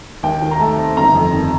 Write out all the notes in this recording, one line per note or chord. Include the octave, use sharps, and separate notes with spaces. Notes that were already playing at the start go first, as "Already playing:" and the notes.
D#2 G5
D#3
A#5
A3 A5
C4
G1 A#5
F2
D#3